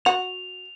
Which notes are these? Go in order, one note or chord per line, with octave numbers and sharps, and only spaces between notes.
F#4 F7